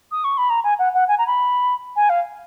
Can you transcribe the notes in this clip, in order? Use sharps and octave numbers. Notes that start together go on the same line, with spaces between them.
D#6
C#6
B5
A#5
G#5
F#5
F#5
G#5
A#5
B5
G#5
F5